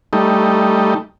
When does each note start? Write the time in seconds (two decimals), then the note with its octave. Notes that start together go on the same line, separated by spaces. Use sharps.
0.13 G3 A3 D#4